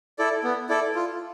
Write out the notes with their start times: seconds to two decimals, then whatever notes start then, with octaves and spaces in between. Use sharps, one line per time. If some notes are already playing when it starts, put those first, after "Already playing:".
0.18 E4 A4 D5
0.44 B3
0.69 E4 A4 D5
0.95 F4